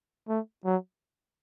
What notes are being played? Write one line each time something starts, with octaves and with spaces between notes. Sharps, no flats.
A3
F#3